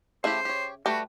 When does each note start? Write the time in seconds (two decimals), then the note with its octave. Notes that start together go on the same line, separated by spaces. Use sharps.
0.24 C#3 A3 E4 G4 C5 E5
0.45 G4 C#5
0.86 G3 A3 F#4 G4 B4